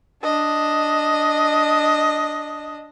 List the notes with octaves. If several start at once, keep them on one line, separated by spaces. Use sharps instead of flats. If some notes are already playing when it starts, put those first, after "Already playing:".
D4 D#5